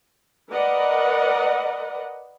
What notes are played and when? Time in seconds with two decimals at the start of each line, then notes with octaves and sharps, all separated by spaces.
0.51 A#4 B4 D5 D#5 F#5